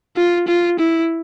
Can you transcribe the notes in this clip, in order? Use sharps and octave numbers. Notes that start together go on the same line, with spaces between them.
F4
F4
E4